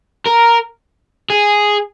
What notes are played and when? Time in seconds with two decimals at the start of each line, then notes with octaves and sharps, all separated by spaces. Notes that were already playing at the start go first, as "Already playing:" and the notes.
0.26 A#4
1.30 G#4